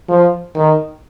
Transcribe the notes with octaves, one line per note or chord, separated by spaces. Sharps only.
F3
D#3